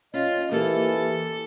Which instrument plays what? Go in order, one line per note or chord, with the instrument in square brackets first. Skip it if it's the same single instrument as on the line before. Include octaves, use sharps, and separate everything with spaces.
[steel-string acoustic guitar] C#4 [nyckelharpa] F4 [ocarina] D#5
[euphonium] E3 [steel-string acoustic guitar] A#3 [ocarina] G4 [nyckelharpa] A4